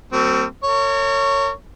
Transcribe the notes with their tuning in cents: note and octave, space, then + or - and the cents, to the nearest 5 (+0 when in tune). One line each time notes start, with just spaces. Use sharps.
F#3 +20 A3 +45 C4 -15
A#4 -40 C#5 +0